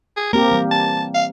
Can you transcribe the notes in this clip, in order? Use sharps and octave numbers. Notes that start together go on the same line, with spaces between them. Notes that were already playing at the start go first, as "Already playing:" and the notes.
G#4
A#3 C4 G4 A#4
E3 G3
A5
F5